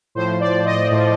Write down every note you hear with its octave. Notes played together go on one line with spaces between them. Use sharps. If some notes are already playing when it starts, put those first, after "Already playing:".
A2 F3 C5
D5
D#5
A2 F3